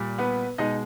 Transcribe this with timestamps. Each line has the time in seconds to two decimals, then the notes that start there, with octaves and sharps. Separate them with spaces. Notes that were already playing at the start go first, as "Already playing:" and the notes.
Already playing: A#2 G3
0.18 B3 B4
0.58 B2 G#3 D#4 D#5